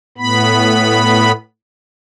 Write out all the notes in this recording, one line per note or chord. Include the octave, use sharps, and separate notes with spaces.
A2 B3 B5